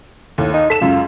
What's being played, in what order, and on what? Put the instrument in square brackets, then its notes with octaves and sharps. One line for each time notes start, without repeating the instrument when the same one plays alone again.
[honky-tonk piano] D#2 [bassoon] A2
[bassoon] D#4
[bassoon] A4 [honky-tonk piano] B6 E7
[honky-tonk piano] C#2 F#2 [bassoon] F4